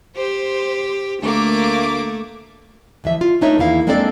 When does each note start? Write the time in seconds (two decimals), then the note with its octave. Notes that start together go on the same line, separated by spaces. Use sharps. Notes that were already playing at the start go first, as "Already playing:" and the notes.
0.17 G4 C5
1.22 D2 A3 A#3 D6
3.04 D2 E3 F3 E5
3.21 F4
3.41 A3 D4 D#4 A#4 C#5 E5
3.58 E2 D#3 A#3 E4 F5
3.87 G#3 A#3 C4 D4 A4 D5